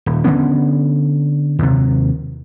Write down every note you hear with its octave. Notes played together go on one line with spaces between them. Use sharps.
D#1
D3 D#3 B3 C#4
D#2 C3